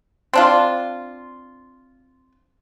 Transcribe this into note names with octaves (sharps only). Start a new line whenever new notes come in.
C4 D4 F4